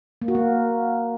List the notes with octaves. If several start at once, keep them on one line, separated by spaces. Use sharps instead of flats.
A#3
F#4
A#3